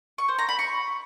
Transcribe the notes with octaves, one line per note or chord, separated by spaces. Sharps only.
C#6
C5
A#5
B5
C#6